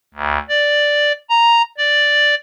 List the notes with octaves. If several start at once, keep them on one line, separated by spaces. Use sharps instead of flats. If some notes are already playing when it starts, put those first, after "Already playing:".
D2
D5
A#5
D5